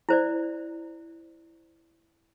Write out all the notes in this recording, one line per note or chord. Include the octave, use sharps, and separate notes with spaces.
E4 C5 D5